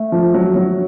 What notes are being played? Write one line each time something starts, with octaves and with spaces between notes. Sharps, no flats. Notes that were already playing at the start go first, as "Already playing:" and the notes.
Already playing: A3
F3
F#3
F#3